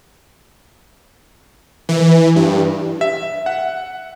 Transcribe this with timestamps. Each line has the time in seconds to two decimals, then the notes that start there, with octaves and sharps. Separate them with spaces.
1.89 E3
2.36 G2
3.01 E5
3.46 F#5